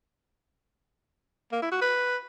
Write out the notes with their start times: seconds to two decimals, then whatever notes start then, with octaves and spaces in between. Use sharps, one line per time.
1.52 A#3
1.62 E4
1.72 F#4
1.81 B4